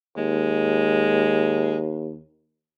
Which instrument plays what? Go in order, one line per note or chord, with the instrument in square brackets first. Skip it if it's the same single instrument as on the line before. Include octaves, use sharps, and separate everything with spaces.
[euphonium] D#2 [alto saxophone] G#3